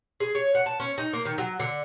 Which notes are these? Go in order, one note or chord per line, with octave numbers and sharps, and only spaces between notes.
G#4
C#5
F#5
A5
C#4
D#4
A#3
D#3
F#3
D3